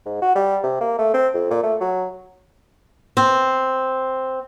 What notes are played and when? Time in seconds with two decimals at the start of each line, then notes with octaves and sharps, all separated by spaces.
0.06 G#2
0.22 F#4
0.36 G3
0.63 C3
0.81 A#3
0.99 A3
1.14 C4
1.34 F2
1.50 A#2
1.63 A3
1.81 F#3
3.17 C4